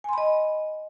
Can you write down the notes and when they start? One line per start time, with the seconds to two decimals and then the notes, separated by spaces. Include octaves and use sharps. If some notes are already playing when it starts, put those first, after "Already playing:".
0.04 G#5
0.09 C6
0.13 B5
0.18 D#5